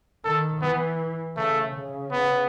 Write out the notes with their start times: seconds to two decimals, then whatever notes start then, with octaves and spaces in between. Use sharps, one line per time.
0.25 D#3 A4
0.62 E3 B3
1.36 C#3 A3
1.74 C#3
2.12 B3